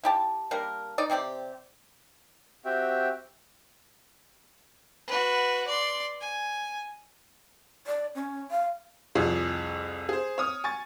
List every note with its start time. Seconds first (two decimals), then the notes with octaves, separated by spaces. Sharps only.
0.03 E4 G4 A5
0.51 G3 A#3 D4 A#4
0.98 D#4 D5
1.10 C3 C4 G4 D5
2.65 C4 F#4 G4 E5 G5
5.08 F#4 B4
5.68 D5 C6
6.21 G#5
7.87 D5
8.15 C#4
8.51 F5
9.15 C2 F2 F4 G#4 C#5
10.09 G#4 C5
10.38 C#5 D#6 F6
10.64 G#5 C#6 A6